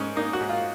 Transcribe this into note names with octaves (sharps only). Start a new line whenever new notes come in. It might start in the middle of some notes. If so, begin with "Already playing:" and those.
Already playing: G#2 C#4
A#3 D#4
F#4
G#2
F4